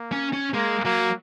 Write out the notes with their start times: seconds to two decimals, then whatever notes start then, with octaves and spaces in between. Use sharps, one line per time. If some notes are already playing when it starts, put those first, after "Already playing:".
Already playing: A#3
0.12 C#4
0.33 C#4
0.54 G#3 A#3
0.85 F#3 A#3